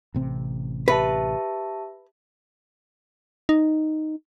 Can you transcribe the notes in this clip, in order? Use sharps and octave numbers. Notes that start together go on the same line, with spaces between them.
A1 C3 C4
G4 B4 E5 A5
D#4